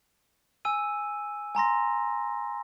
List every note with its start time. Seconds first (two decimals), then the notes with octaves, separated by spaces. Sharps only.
0.65 G#5 E6 D#7
1.55 G#5 A#5 C6 A#6